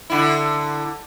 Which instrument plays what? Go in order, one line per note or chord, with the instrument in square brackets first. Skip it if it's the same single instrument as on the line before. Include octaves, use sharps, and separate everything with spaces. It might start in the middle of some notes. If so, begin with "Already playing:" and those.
[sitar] D3 E4